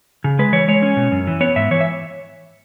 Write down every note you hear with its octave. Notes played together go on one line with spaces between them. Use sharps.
C#3
G#3 B4
E3 C#5
G#3 C#5
C#4
B2
F#2
E3
B3 C#5
G#2 E5
E3 C#5
E5